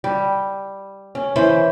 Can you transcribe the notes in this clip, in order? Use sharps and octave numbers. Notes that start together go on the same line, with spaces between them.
G3
C#4
E3 C#4 C5 B5